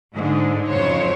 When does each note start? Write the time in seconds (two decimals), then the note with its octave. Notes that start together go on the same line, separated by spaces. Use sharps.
0.15 G#2 D3
0.69 F2 C#3 F#3 C5 C#5